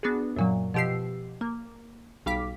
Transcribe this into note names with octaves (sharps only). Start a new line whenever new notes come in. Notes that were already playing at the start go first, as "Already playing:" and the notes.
B3 D4 F#4 G#4
F#2 A#2 F#3
B2 F3 G4 E6 C7
A#3
B1 G3 F5 D6 B6